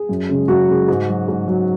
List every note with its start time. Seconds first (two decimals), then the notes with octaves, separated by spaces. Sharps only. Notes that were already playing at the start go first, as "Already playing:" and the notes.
Already playing: G#4
0.09 F#2
0.29 C#3 G#3
0.48 F#2 F#4
0.69 C#3 G#3
0.88 G#2
1.09 F#3
1.28 G#2
1.48 F#3